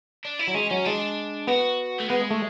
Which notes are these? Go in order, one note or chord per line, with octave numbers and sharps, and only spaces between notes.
D4
E4
F#3
G#3 C#4
F#3 C#4
G#3 D4
B3 F#4
A3
G#3 B3
A3